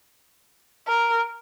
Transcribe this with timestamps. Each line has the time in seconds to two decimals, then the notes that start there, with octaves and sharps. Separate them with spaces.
0.87 A#4